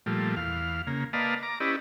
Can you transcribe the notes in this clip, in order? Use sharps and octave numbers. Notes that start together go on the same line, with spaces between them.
A#2 F3 G3 A3
E2 F5
C#3 A#3
A#3 B4 D5 D#5 F5 A5
A#5 D6
C#4 E4 G4 B4 D5 D#5